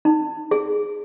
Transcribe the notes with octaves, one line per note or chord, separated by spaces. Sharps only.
D#4
G#4